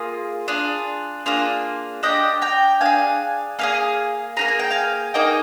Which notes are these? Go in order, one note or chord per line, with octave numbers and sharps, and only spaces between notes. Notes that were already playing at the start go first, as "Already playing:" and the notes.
Already playing: A#3 F4 G#4
D4 F4 G#4
A#3 D4 F4 G#4
D4 G4 D#5 G5
G5 A#5
D4 G#4 F5 G#5
A#3 D4 G#4 F5 G#5
A#3 D#4 G#4 A#5
G#5
G5
F5 G#5
A#3 D#4 G#4 D#5 G5